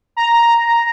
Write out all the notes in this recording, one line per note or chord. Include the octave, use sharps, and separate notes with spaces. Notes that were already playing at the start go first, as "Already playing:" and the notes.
A#5